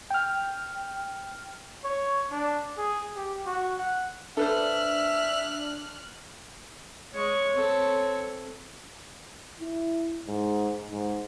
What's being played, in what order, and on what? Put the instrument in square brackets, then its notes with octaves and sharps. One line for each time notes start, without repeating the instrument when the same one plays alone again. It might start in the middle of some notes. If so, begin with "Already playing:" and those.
[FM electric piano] G5 F6
[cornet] C#5
D4
G#4
G4
F#4
F#5
[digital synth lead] D4 [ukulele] A4 B4 C5 [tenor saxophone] E5 [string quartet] F6 F#6
[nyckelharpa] G#3 C#6 [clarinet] C#5
[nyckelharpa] C4 A4
[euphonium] E4
G#2
G#2